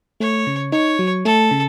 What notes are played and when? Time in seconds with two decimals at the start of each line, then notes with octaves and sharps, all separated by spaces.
0.20 A3 C#5
0.47 C#3
0.72 D#4 C#5
0.99 F#3
1.25 A3 A4
1.51 C#3